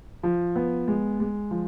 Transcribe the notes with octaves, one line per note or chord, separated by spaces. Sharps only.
F3
B3
G#3
G#3
F3